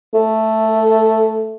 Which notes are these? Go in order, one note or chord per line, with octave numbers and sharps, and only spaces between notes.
A3